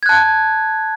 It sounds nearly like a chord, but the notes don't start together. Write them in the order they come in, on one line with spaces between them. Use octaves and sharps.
G#6 F#6 A5